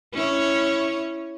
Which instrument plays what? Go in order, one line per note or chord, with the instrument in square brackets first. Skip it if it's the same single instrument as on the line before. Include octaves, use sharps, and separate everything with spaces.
[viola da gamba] C#4 E4 C#5